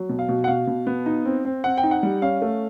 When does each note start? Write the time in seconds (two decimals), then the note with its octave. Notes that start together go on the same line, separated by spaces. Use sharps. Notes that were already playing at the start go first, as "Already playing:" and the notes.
Already playing: F#3
0.09 B2
0.19 F5
0.29 B2
0.44 F#5
0.48 B2 F5
0.67 B2
0.87 B3
1.06 D#4
1.25 C4
1.45 C4
1.64 C4 F#5
1.77 G5
1.83 D#4
1.91 F#5
2.03 G3
2.22 C#4 F5
2.42 A3